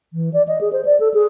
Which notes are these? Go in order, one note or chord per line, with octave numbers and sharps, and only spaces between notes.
E3
D5
D#5
G#4
C5
D5
A4
G#4